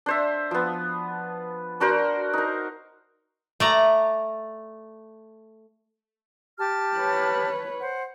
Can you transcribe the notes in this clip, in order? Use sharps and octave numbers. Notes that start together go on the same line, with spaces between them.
D4 C5 E5
F3 B3
D4 F#4 A#4 C5
D#4 A#4
A3 D5 A#5
G4 A5 F6
B4 C#5
C5 F#5